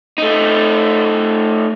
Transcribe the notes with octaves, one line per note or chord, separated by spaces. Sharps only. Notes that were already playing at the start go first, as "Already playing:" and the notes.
A3 D#4